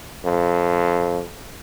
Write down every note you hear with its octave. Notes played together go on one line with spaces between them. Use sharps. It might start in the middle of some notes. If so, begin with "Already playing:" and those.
F2